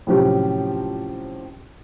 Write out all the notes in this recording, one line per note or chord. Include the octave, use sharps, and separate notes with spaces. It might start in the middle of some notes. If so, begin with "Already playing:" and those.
A2 C3 F3 F#3 C#4 G4